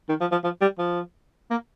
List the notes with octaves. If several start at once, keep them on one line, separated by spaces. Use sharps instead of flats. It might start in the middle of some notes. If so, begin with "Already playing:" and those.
D#3
F3
F3
F3
G3
F3
A#3